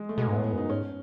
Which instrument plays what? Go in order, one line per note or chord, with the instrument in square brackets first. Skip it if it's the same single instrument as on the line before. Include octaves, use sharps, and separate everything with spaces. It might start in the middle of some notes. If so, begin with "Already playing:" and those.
Already playing: [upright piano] G#3
A3
[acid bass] B2 [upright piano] G#3
[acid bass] G#2 [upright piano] B3
[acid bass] A2
[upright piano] B3
[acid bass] F#2 [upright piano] D#4
[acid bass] G#2 [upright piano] C#4